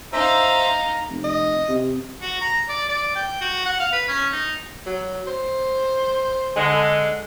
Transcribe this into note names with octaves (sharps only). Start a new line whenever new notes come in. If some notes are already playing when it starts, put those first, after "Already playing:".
D#4 C5 E5 F5 A#5 E6
F1
D#5
C3
F#4
A#5
D5
D5
G5
F#4
F#5
F5
B4
C#4
D#4
F#3
C5
D3 G#3